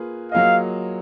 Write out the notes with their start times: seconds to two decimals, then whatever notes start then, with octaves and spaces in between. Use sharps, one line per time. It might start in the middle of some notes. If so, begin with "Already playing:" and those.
Already playing: A#3 F4 G#4 B4
0.32 F#3 A#3 F4 G#4 D#5 F5